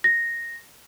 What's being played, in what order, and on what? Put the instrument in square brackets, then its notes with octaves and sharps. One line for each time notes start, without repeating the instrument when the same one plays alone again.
[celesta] A#6